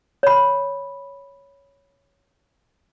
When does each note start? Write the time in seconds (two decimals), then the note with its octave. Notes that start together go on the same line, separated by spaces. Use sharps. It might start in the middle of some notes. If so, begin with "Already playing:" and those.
0.23 C#5 B5